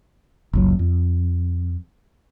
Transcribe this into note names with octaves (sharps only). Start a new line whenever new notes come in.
F#1 C#2 F#3
F2